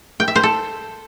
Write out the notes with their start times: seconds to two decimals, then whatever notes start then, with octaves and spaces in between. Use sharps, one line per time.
0.20 G5
0.28 E5
0.36 C5
0.43 A4